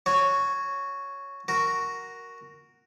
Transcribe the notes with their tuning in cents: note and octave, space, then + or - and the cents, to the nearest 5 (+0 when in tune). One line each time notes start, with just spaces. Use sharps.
F#4 -15 C#5 +0
F#4 +0 A#4 +0